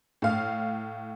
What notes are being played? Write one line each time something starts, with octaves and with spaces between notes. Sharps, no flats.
A2 F5